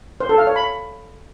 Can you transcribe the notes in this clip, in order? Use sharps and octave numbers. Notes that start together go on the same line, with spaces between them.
C5
A4
F5
C#5
B5